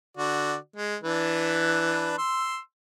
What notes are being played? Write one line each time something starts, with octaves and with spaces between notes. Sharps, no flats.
D3 F#4 D5
G#3
E3 D4 B4
C6 E6